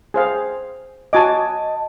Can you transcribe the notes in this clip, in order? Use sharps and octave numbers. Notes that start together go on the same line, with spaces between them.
G#4 C5 F5
F#4 D#5 G#5 A5 D6